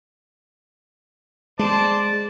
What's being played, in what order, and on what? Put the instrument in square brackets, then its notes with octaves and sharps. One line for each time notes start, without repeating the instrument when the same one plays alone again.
[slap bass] G#3 [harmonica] C5 D5 A5